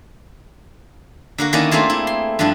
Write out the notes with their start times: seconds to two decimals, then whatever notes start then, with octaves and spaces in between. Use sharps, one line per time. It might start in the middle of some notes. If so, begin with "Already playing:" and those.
1.38 D3 A#3 F#4
1.53 D#3 A#3 C#4 E4 A#4 D5
1.71 A3 A#3 C4 F4 G#4
1.90 E4
2.07 C6
2.39 G2 F3 D4 E4